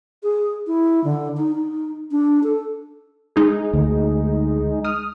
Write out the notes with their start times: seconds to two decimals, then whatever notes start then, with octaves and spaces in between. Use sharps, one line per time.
0.23 G#4
0.67 E4
1.04 D3
1.37 D#4
1.55 D#4
2.11 D4
2.43 A4
3.36 G#3 D#4 G#4
3.73 D2
4.85 D#6 F6